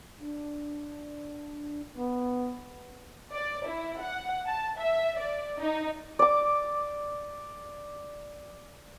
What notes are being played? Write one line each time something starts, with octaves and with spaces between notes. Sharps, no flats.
D4
B3
D5
E4
F#5
A5
E5
D5
D#4
D5 D6